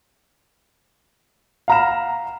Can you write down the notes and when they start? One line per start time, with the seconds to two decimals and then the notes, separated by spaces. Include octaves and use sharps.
1.68 F5 F#5 A#5 B5 F6 E7